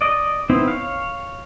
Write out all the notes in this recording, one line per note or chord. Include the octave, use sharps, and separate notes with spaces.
D5 D#5
B3 C4 D#4 E4
C#5 F5